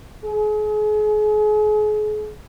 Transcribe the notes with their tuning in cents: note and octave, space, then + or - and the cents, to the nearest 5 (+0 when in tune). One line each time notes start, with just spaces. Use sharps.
G#4 +35